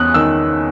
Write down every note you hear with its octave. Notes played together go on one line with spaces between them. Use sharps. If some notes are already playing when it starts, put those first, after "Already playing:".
Already playing: E2 C#4 D#6 F#6
D#3 E6